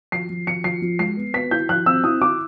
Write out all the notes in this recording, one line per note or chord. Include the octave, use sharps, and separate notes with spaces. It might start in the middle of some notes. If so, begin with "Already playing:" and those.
F3 C7
F3
F3 C#7
F3 C7
F3
G#3 C7
B3
B3 B6
E4 G6
F3 F#6
C4 E6
E4 D#6
E4 D6